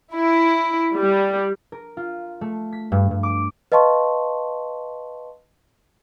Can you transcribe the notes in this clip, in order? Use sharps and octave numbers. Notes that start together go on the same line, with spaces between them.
E4
G3
A#4
F4
A3
B6
G2
G2
D6
B4 D#5 F5 A5 C6 C#6